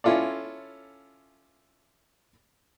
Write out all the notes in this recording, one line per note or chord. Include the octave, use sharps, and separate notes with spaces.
C#4 E4 F4 A4 D5